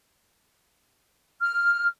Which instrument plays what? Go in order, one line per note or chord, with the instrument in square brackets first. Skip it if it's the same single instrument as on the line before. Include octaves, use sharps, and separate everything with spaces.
[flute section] F6